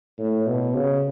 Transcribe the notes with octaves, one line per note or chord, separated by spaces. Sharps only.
A2
B2
C#3